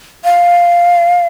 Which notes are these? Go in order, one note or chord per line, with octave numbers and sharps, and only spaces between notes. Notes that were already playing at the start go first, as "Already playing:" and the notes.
F5